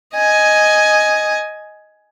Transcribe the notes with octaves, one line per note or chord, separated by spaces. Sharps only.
D#5 G#5